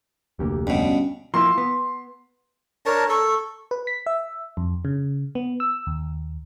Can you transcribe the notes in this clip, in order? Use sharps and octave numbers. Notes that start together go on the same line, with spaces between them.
F1 D2 A#3 G4
G2 B2 C#4
F3 A#3 E4 C6
B3
D4 A#4 C#5 A5
A4 C#6
B4
B6
E5
F2
C#3
B3
E6
D#2